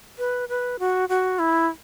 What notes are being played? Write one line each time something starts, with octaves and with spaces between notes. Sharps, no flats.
B4
B4
F#4
F#4
E4